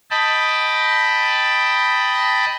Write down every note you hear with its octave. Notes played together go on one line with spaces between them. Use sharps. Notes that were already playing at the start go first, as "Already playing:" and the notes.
D#5 G5 A5 B5